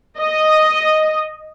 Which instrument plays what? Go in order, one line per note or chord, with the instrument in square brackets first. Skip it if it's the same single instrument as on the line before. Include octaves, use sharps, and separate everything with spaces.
[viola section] D#5